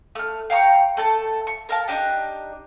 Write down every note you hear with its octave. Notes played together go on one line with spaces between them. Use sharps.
A3 F6
F5 G5 A#5 C#6
A3 A4 A5
C#6
A#4 F5 A5
D4 D#4 G4